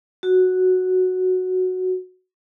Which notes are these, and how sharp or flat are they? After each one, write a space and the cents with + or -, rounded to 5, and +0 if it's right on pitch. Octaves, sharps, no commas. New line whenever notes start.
F#4 -5